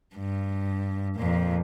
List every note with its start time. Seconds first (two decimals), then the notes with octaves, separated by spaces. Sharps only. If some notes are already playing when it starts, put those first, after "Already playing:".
0.16 G2
1.16 F2 A#2